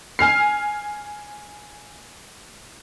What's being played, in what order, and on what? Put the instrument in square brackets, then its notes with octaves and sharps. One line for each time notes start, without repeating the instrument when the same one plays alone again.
[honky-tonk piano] G#5 F6 C7